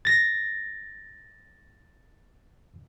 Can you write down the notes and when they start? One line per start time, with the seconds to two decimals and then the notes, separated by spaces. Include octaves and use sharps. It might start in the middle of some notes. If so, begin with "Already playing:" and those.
0.05 A6 A#6